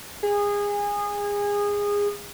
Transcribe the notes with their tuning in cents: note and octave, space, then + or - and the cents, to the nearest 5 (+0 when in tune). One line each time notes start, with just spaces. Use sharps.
G#4 -25